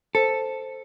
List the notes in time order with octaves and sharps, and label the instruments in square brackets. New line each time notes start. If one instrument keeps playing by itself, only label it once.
[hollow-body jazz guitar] A4 [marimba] C5